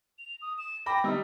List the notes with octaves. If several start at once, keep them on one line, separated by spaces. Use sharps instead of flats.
F7
D#6
E7
G5 B5 D6 A#6
G3 D#4 E6